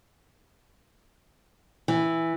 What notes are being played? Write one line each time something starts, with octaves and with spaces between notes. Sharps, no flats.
E3